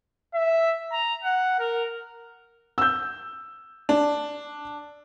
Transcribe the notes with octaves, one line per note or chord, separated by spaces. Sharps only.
E5
A#5
F#5
A#4
E6 G6
D4